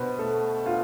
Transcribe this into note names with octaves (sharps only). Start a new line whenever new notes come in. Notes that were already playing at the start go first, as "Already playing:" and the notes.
Already playing: B2 B4 C5
A3 A4
F4